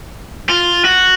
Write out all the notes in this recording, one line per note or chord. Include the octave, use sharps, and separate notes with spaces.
F4
F#4